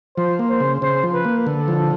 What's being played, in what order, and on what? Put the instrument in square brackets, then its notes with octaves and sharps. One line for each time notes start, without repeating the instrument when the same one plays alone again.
[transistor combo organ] F3 [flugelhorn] C5
[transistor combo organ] A#3
[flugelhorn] C5
[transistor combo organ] C#3
[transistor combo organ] C#3 [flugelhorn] C5
[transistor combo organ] F3
[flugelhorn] B4
[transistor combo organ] A#3
[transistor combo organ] D3 [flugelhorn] A4
[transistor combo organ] F3